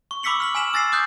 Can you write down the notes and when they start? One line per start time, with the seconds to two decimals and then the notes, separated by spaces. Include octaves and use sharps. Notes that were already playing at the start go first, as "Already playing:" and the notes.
0.11 C#6
0.23 B5 D6 E6 B6 C#7 F#7
0.40 F6 B6 F#7
0.55 G#5 F6 B6 E7 F#7
0.73 D6 E6 A6 A#6 C7 E7
0.92 D6 D#6 F#6 G6